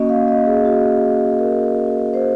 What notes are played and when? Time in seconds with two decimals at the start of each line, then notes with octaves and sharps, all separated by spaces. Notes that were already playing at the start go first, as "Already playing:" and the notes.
Already playing: A#3 C#4 F#4 D#5
0.09 F5
0.28 D#5
0.46 G#4
0.65 F#4
1.39 A#4
2.14 C5